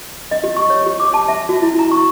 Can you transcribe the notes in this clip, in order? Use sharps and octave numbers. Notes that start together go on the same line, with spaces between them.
D#5
G4
C#6
C#5
G4
D6
A5
E5
F#4
E4
A#5
C#6